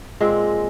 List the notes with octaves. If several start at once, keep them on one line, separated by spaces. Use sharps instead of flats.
A#2 G#3 C4